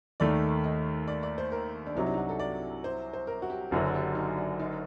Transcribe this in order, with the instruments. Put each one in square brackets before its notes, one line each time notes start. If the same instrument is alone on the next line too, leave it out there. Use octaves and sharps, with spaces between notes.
[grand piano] D#2 D#3 A3 [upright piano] D5
[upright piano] D#5
D5
D5
C5
A#4
D4
[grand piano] C2 C3 F#3 [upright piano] D#4
[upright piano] D4
D#4
F#4
A4
D5
C5
C5
A#4
F#4
G4
[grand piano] F#1 F#2 D3 F#3 [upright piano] F#4
[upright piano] G4
D#4
D4
D#4